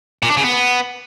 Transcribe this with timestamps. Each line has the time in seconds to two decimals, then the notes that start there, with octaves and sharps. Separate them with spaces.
0.23 A#2
0.30 D4
0.37 C#3
0.44 B3